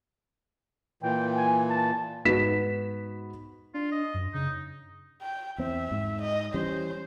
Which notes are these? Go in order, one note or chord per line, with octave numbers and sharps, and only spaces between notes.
A#2 E3 G5
G#5
A5
G#2 B3 F#4 B4 B6 E7
D4 F4
D#5
F#2
C#3 D#4
G5
E2 C4 E5
G#2
D#5
E3 G3 C#4 C5